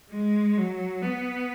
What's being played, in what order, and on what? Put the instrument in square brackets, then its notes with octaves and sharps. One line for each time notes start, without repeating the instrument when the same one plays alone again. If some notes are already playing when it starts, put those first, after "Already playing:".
[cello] G#3
F#3
B3